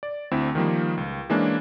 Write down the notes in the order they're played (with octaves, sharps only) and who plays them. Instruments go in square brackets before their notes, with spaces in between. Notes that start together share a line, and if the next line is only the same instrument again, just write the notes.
[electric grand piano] D5
D2 C4 E4
D#3 F3 G3 A#3
C#2
E3 G#3 A#3 C#4 D4